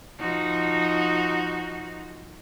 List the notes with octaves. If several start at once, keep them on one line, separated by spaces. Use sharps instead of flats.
F3 D#4 F#4